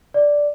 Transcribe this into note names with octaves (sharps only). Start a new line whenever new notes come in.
D5